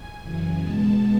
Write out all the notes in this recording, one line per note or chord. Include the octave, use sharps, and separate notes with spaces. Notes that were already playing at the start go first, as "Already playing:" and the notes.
Already playing: G#5
F#2 C#3 E3
B2 G#3 B3 A5